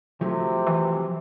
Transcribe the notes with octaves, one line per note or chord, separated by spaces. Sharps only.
C3 F3 F#3 A3
E3